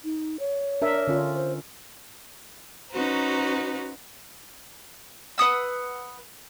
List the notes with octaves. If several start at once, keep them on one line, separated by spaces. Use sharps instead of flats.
D#4
C#5
D4 A#4 E5
D3 C#4 F4
C5
C#4 D#4 F#4 B4 C5 A#5
B4 F#5 D#6 E6